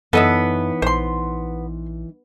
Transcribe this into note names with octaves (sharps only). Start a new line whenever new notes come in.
F#2 E3 B3 D#4 A4 C#5 D#5 E5
A#1 C5 C6